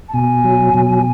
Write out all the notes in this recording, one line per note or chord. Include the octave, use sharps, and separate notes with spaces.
A5
B2 G#5
F#3
B2